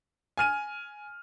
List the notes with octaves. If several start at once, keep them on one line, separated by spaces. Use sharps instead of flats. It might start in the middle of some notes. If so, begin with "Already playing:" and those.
G#5 F6 D#7